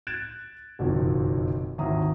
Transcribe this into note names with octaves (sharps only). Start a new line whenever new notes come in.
F#6 G#6 A6 D7 E7
F#1 B1 F2 D#3 F3
G#1 D#2 E4 A#5 D#6